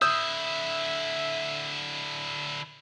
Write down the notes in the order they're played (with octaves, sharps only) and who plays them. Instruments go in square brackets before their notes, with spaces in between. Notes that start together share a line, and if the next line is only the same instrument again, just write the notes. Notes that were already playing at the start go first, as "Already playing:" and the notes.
[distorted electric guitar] D3 E4 [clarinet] E5 [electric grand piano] D#6 E6 G6